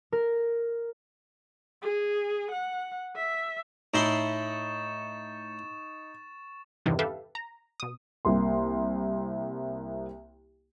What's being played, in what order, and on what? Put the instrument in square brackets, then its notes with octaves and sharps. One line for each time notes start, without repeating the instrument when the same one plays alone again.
[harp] A#4
[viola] G#4
F#5
E5
[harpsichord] A2 E4 C6 [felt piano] D#4 [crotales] C#6 A6 E7
[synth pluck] E2 G2 C3 D#3 E3
G4 A4 B4 E5 F5
A#5
B2 D#6
[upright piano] C2 A#3 C6